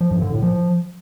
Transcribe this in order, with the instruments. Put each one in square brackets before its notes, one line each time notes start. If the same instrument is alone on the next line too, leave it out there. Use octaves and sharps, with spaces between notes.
[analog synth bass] F3
G2
D3
A2
F3